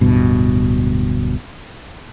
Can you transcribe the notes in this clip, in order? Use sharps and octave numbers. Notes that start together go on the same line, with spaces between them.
D1 G2 B2